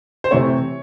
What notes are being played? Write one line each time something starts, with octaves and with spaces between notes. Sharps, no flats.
C5
C3 E3 A3 C4 C#5